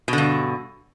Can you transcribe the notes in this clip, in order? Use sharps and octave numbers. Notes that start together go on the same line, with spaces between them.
G2 B2 D3